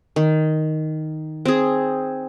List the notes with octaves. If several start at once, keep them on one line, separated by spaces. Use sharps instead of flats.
D#3
C4 G#4